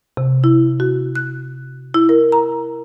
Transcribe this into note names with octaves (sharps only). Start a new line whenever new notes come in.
C3
E4
F#4
F#6
E4
A#4
A#5